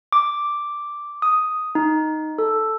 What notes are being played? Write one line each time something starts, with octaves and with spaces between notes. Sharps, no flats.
D6
D#6
D#4
A4